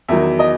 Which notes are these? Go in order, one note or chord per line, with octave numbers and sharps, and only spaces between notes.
E2 D#3 F#3 E5
D#5